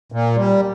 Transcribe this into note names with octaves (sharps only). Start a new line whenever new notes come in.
A#2
G3